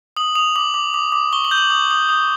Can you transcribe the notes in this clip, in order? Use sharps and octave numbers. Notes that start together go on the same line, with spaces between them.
D#6 F#7
D#6 F7
D6 F#7
D6
D6
D6
C#6 G7
F#7
G6
F#7
D#6
D#6
D#6